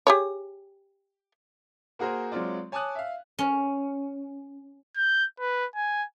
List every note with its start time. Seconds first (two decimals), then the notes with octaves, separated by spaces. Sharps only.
0.07 G4 G#4 C#5
1.99 A#3 F#4 G#4 A#4 C5
2.32 F#3 G#3 C4 F4 D5
2.72 C#5 G#5 A5 D6 D#6 F#6
2.95 E5 F5
3.39 C#4
4.96 G6
5.40 B4
5.76 G#5